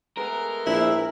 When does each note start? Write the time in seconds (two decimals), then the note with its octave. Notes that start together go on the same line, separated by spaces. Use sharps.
0.18 G#3 A3 B3 A#4
0.67 A#1 E4